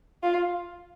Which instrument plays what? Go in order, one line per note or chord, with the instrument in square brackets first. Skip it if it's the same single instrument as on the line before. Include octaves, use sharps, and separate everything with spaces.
[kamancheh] F4